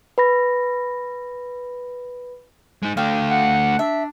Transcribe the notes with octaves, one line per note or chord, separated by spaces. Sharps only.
B4 B5 A#6
G#3 D#4
D3 A3 F5 G5
F#5
D4 E5